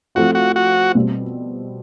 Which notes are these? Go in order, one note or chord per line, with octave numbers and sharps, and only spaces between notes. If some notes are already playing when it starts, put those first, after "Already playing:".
F3 A3 C4 F4 F#4
F#4
F#4
B2 G3 C4